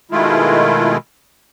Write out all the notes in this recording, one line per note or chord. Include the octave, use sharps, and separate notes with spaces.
B2 D#3 G#3 A3 E4 F4